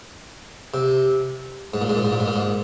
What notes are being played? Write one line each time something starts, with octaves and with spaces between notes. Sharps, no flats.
C3
G#2
A#2
G#2
A#2
G#2
A#2
G#2
A#2
G#2